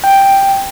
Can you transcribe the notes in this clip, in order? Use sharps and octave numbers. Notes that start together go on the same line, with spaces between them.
G5